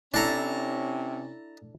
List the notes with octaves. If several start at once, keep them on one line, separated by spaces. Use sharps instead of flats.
C3 C#4 D4 E4 A4 A5 A#5